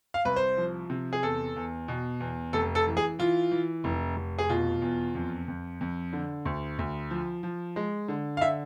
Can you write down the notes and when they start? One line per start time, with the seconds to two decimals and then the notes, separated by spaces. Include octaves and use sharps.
0.14 F5
0.25 C2 B4
0.36 C5
0.57 F3
0.90 C3
1.13 G#4
1.23 E2 A4
1.56 E2
1.88 B2
2.20 E2
2.53 F1 A4
2.75 A4
2.87 E3
2.97 G#4
3.19 E3 F4
3.51 E3
3.84 F1
4.16 F1
4.39 G#4
4.49 B2 F4
4.82 E2
5.15 F2
5.48 F2
5.81 F2
6.13 D3
6.45 D2
6.79 D2
7.10 F3
7.43 F3
7.76 G#3
8.08 D3
8.37 F5
8.41 D3 E5